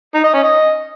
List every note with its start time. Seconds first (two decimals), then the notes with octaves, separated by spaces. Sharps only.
0.15 D#4
0.24 D#5
0.34 C#4
0.43 D#5